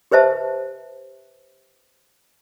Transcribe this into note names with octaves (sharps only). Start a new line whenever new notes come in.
G4 B4 C5 E5 A5